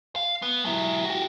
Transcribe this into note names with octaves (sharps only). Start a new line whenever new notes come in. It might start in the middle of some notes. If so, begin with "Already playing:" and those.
F5
B3
F#3 E4
F#4 G4